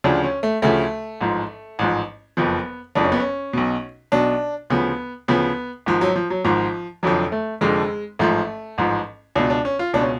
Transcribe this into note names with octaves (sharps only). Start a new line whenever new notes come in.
D2 C#3 F3 D4
C#4
A3
D2 C#3 F3 A3
A1 G#2 F3
A1 G#2 F3
F#1 F2 F3 B3
F#1 F2 F3 D4
C#4
B3
C#4
B1 B2
B1 B2 D4
D2 C#3 F3 B3
D2 C#3 F3 B3
G#1 G#2 F3
F#3
F3
F#3
G#1 G#2 F3
F1 F2 D3 F3 F#3
A3
F1 F2 D3 F3 G#3
A1 G#2 F3 A3
A1 G#2 F3
C#2 B2 D4
D4
C#4
F4
C#2 B2 D4
C#4